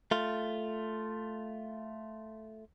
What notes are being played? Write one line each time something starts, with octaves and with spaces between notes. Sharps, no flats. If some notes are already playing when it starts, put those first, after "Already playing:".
A3 F4